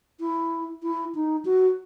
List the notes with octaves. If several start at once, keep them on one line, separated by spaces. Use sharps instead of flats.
E4
E4
D#4
F#4